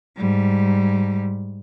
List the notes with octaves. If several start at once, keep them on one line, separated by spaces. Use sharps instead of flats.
G#2 G3